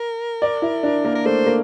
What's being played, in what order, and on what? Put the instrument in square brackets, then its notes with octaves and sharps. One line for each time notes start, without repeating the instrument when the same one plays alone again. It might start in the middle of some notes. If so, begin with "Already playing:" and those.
Already playing: [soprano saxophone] A#4
[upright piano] D5
E4
D4
A#3
[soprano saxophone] A#4
[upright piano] A3 [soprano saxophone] C5
[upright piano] A#3